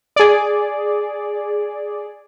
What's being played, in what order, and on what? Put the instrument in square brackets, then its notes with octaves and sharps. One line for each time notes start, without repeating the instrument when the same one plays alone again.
[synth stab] G#4 D5